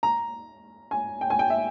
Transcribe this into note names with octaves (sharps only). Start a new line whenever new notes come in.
A#5
G#5
G5
G#5
G5
E5